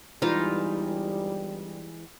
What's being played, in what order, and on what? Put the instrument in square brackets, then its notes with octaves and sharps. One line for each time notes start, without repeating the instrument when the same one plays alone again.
[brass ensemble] G1 G3 [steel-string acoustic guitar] E3 G#3 [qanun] D#4 F4 F5